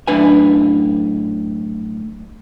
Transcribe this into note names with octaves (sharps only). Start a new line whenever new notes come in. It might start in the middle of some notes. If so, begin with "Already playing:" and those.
F#2 A2 D4 B4 G#5